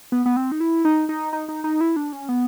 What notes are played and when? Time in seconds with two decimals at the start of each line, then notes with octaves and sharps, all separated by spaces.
0.12 B3
0.26 B3
0.36 C4
0.52 D#4
0.60 E4
0.85 D#4
1.09 D#4
1.33 D#4
1.49 D#4
1.64 D#4
1.81 E4
1.96 D4
2.13 C#4
2.29 B3